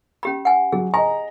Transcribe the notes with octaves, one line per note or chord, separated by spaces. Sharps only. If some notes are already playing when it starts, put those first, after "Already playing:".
C#4 G4 B5
F#5 G#5
F#3 G#4
D#5 G#5 A#5